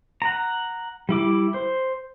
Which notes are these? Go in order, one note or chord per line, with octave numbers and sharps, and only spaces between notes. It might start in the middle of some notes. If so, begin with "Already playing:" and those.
F#5 A#5
G3 E4 D6
C5